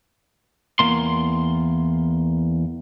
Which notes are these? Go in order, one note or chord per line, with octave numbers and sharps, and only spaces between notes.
E2 A#3 C6